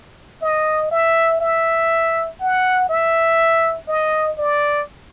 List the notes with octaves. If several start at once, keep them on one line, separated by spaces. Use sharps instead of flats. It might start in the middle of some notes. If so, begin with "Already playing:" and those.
D#5
E5
E5
F#5
E5
D#5
D5